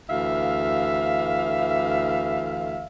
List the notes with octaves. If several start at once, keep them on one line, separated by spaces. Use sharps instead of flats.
D2 E3 E5 F5